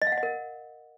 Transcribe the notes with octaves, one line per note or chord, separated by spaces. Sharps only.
D#5
F5
F#5
D#5
A#4